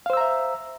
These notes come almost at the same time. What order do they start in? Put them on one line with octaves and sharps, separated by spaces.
F5 C5 E6 A#5 E5